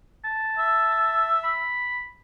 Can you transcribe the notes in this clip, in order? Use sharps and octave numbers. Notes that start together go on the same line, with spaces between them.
A5
E5
B5